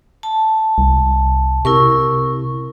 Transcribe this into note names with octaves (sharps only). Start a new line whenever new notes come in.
A5
C2
C3 E4 A#4 C#6